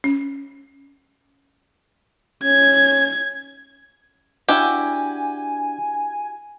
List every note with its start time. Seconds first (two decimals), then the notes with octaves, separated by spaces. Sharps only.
0.04 C#4
2.44 C#4 G#6
4.48 D4 E4 F#4 G4 F#5 G#5